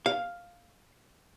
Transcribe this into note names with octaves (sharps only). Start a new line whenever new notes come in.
F5